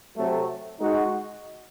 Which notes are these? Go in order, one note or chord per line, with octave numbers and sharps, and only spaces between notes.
C3 F#3 A3
G#3 D#4 F#4